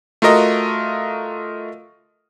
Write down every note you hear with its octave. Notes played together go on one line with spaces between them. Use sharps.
A3 F4 F#4 A#4 D#5